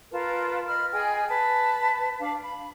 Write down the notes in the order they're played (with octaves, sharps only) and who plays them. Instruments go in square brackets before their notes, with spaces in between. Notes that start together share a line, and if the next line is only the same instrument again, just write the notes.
[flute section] F4 A#4 B4 A5
D#5 B5 F6
G#4 D#5 G5 G#5
B4 A5
D4 F5
B5